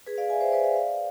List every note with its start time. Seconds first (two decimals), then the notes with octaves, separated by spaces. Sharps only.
0.06 G#4 B4
0.18 D5 F5
0.30 E5 G#5
0.41 C5 E5
0.52 B4 D5
0.64 D5 F5
0.76 D5 F5